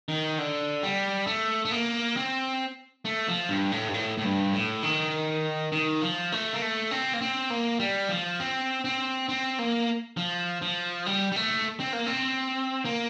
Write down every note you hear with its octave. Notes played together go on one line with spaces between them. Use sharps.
D#3
D3
G3
A3
A3
A#3
C4
A3
F3
G2
A2
G2
A2
A2
G2
A2
D#3
D#3
F3
A3
A#3
A3
C4
A#3
C4
A#3
G3
F3
C4
C4
C4
A#3
F3
F3
G3
G3
A3
C4
A#3
C4
A#3